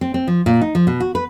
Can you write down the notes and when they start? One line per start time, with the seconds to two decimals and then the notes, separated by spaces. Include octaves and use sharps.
0.01 C4
0.14 C4
0.27 F3
0.46 A#2
0.62 D#4
0.75 F3
0.87 B2
1.00 F#4
1.15 B4